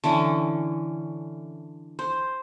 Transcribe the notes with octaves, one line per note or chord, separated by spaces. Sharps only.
D3 E3 C#4
C5